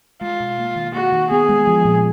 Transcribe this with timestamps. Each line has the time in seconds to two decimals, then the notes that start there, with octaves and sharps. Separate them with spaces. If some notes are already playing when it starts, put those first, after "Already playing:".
0.21 G#3 F4
0.40 B2
0.58 A#3
0.76 D#3
0.94 A#3 F#4
1.12 D#3
1.30 B3 G#4
1.49 G#3
1.67 F3
1.85 A#2